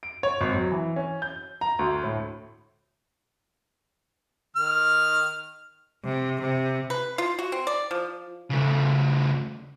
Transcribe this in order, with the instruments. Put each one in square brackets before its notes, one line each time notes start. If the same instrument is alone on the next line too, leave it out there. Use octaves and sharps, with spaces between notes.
[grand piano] D7
C#5
G#1
F#3
E3
C#4
G6
A#5
D2
A2
[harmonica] D#3 F6
[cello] C3
C3
[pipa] B4
F4
F#4
C4
D5
F3
[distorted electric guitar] C#3 A3